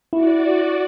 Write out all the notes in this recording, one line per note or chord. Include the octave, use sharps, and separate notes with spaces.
E4 F#4 D5